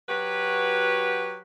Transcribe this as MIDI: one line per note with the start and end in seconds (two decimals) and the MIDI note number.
0.09 1.41 54
0.09 1.41 66
0.09 1.41 67
0.09 1.41 71